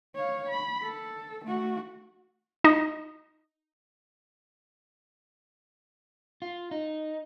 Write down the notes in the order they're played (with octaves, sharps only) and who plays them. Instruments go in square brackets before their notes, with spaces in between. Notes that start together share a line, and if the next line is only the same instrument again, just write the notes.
[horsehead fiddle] C#5 F5
B5
A4
A3 F#4
[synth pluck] D#4 D#5
[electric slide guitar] F4
D#4